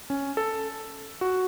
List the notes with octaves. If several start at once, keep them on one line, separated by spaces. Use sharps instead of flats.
C#4
A4
F#4